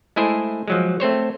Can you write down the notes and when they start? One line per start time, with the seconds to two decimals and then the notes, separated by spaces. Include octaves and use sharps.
0.16 G#3 A3 E4 G#4 C5
0.68 F3 F#3 G#3
1.00 A3 C4 C5 C#5